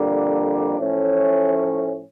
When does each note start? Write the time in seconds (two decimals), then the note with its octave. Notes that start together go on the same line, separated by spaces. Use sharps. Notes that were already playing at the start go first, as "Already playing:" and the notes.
Already playing: F2 D3 G3 A#3 D4
0.77 A2 F3 A3 C#4